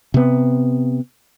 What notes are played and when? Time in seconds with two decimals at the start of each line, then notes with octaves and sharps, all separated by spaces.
0.14 C3 B3